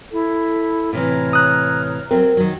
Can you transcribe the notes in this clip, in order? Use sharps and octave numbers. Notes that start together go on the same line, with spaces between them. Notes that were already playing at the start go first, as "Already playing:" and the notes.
E4 A4
A2 C3 E3 C#5 A#5 F6
D#6 F#6
F#3 A3 C4 A#4
D#3 F#3